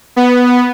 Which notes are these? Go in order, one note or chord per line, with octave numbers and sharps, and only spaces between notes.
B3